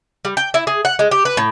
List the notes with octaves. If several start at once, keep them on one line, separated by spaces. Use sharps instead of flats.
G3
G5
E4
G#4
F#5
G#3
G4
B4
A2